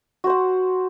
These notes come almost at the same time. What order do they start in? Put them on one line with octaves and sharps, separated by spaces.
F#4 C5 F#5